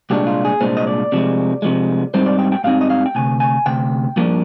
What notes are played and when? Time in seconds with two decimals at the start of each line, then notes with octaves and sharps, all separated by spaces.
0.10 C2 A#2 G#3 D4 G4
0.27 F4
0.45 G#4
0.61 C2 A#2 G#3 D4 C5
0.77 D#5
0.87 D5
1.12 C3 F3 G#3
1.62 C3 F3 G#3
2.14 G#2 G3 C4 D#4 C5
2.26 D5
2.39 G5
2.52 G5
2.64 G#2 G3 C4 D#4 F5
2.81 D#5
2.90 F5
3.06 G5
3.15 D2 C3 G#5
3.40 G#5
3.66 D2 C3 G5
4.16 G2 F3 A#3 D4